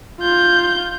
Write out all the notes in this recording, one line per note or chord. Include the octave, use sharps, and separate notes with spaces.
F4 G6